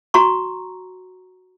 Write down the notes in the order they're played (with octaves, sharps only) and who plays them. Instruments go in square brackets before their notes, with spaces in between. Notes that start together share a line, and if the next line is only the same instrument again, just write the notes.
[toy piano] F#4 A#5 C#6